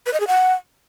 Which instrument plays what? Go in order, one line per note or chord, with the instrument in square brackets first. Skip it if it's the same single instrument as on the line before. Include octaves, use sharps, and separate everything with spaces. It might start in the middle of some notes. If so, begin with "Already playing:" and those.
[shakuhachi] B4
D#5
G#4
F#5